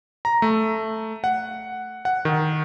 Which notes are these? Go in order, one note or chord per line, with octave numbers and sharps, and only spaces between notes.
A#5
A3
F#5
F#5
D#3